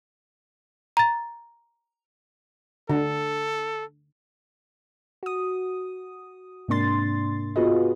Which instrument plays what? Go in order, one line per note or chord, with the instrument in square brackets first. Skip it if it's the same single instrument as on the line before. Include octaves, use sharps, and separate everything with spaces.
[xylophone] A#5 A6
[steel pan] D3 [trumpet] A4
[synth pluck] F#4 D#6
G#2 C3 A#3 D4 C6 A6
B3 F4 F#4 G#4 B4 D#5